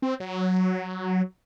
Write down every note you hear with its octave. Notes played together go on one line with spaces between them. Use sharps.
C4
F#3